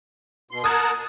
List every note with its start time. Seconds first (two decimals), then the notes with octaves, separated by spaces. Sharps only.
0.51 B2 C6
0.64 A#4 F#5 A5 D#6 G#6